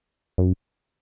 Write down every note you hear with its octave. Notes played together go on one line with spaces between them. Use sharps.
F#2